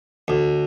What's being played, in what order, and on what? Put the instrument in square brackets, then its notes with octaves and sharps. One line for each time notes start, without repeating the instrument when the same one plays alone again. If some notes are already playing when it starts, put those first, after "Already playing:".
[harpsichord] D2